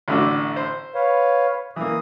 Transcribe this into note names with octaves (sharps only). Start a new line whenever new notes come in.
A1 D3 F#4
C5
B4 C#5 F5
E3 A#3 D#6